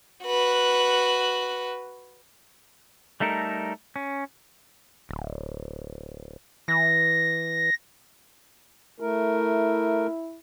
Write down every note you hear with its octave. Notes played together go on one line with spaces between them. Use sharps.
F#4 B4
G3 A3 D#4 A4 A#4
C#4
D1
E3 A#6
A3 E4 A#4